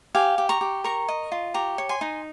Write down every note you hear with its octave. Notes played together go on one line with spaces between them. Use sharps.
G4 F5 G#5
G4
A#5 C#6
G4
A#4 A#5 C#6
D#5
F4
G4 A#5 C#6
C#5
G#5 C6
D#4